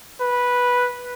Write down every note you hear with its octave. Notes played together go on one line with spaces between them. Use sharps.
B4